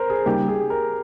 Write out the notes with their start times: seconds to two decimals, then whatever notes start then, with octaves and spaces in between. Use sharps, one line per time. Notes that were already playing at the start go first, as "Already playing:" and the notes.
Already playing: A#4 C5
0.10 G#4
0.26 C#3 G3 A#3 D#4 G4
0.48 G#4
0.70 A#4